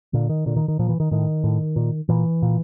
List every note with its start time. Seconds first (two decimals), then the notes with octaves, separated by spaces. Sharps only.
0.13 A#2 D3
0.29 D#3
0.46 A#2 D3
0.56 D#3
0.68 D#3
0.79 A#2 F3
0.89 E3
1.00 D#3
1.11 A2 D#3
1.44 A2
1.76 A#2
2.09 A#2 E3
2.42 A#2